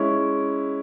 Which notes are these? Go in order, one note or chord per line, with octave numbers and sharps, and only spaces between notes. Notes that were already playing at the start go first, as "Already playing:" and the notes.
Already playing: G#3 C#4 E4